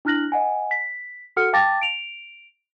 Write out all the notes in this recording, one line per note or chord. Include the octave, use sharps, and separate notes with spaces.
D4 E4 F6 F#6 A#6 F#7
D#5 F#5 G#5
B6
F#4 A4 F#5 F6 C#7
F5 G5 A5 D6 A6 A#6
D7 F7